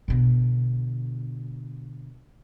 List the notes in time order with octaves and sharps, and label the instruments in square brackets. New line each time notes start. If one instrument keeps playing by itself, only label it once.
[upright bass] B2 D3